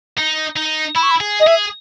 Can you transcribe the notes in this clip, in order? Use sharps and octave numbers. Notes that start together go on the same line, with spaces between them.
D#4
D#4
E4 B5
C#6
B5
G#4
D#5
G#4 E5